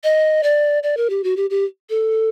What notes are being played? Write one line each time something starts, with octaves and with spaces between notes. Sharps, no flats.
D#5
D5
D5
A#4
G4
F#4
G4
G4
A4